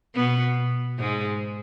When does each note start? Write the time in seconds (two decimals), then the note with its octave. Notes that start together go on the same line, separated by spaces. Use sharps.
0.16 B2 B3
0.99 G#2 G#3